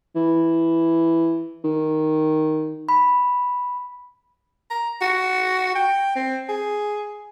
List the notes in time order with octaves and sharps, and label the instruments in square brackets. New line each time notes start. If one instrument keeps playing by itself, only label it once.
[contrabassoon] E3
D#3
[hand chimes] B5
[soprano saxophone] A#5
F#4
G5
C4
G#4